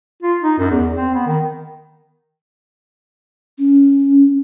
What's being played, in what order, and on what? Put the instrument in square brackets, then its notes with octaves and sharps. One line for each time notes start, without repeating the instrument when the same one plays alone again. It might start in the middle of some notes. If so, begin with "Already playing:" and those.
[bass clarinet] F4
D#4
F#2
E2
C4
B3
D#3
[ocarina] C#4